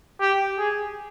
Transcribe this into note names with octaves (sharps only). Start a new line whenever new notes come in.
G4
G#4